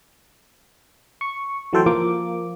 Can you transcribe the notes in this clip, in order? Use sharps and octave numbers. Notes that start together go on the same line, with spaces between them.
C#6
E3 F#3 A3 A4 C5 G5
F3 A#3 D6